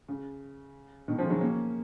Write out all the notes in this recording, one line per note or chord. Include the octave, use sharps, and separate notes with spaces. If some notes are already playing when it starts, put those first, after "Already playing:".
C#3
B2 D#3
C#3 F3
G#3
D#3 F#3
A#3 C#4